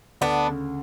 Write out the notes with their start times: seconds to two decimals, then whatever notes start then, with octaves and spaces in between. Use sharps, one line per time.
0.21 D2 B3 D4
0.49 C#3